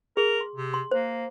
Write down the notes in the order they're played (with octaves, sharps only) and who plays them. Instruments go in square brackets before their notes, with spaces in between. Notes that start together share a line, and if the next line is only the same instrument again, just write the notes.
[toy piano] G#4 [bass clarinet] A#4
[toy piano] C6
[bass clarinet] C3
[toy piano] C6
[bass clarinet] A#3 [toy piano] C5